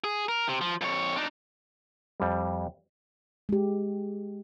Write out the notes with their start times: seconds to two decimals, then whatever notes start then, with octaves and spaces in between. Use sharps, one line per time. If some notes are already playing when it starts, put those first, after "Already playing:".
0.04 G#4
0.28 A#4
0.48 C3
0.61 F3
0.81 F2 C#5
1.16 D4 D#4
2.20 F2 G3
3.49 G#3 G4